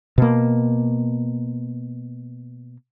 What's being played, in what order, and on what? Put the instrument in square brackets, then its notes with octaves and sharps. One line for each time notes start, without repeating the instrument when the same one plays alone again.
[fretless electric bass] B2 A#3